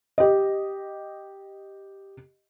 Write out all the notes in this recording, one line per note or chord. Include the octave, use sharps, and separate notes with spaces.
G4 D#5